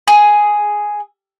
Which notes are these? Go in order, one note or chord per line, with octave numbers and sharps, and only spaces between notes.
G#4